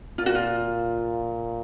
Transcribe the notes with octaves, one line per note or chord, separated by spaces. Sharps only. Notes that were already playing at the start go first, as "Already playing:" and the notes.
A#2 F4
F#4
F4